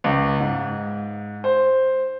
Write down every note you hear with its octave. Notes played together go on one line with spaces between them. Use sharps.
C#2
G#2
C5